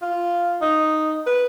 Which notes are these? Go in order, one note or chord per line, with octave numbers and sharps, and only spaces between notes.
F4
D#4
B4